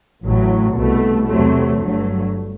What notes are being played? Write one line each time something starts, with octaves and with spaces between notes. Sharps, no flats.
A1 A2 F#3
C2 B2 A3
E2 C3 F#3 A3
G1 G2 F#3 A3